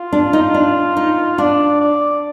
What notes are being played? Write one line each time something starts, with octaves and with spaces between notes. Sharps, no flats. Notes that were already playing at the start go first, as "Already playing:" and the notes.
Already playing: F4
D4
D#4
D4
D#4
D4 D5
D5